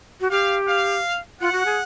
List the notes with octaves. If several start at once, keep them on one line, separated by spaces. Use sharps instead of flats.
F#4
G4 F5
F5
F4 F#5
F#4
G#4